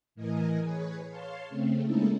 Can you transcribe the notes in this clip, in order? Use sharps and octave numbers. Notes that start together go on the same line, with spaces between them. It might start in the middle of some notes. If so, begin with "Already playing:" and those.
A2 E3 A#4 D#5 G#5
G#4 B4 C#5
C#5 F5 A5 C6
C#3 A3 C4
G#3 A#3 C#4 D#4 E4 A4